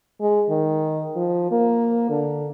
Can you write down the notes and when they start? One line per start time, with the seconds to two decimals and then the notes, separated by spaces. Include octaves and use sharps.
0.21 G#3
0.50 D#3
1.16 F3
1.51 A#3
2.10 D3